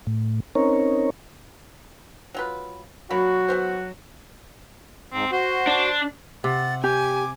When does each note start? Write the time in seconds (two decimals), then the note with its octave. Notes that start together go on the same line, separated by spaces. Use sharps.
0.07 A2
0.55 C4 C#4 D#4 A#4 C#5
2.34 F#3 F4 B4
3.10 F#3 A#3 D4 F#4 B5
3.48 E3 B3 C5
5.13 G#2 C4
5.32 F#4 C5
5.67 D4
6.44 C3 F#5 A6
6.84 G4 G#5 D6